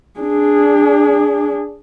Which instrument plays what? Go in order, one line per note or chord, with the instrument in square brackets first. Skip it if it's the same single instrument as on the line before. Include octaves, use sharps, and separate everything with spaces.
[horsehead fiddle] D4 G#4